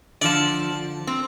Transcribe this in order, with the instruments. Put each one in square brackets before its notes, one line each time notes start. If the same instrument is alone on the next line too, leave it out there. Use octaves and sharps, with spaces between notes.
[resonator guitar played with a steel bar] D3 F3 [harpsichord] D5 A5
[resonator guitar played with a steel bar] C4